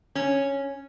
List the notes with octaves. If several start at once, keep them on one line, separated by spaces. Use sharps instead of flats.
C#4